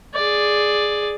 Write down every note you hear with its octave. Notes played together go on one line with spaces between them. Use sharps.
G#4 D5